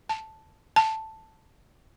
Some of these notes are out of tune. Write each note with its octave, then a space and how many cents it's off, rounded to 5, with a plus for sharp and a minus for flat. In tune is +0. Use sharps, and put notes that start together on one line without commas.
A5 +0
A5 +5